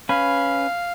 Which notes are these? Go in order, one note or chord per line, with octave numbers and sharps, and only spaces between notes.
C#4 B4 F5